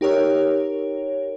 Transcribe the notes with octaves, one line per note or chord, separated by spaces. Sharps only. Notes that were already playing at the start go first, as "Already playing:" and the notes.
D#4 G4 A#4 C#5